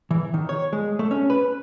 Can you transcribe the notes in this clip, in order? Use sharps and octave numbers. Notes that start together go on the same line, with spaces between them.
E3
D#3
C#5
G#3
A3
C#4
B4